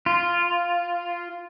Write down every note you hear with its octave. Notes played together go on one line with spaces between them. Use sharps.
F4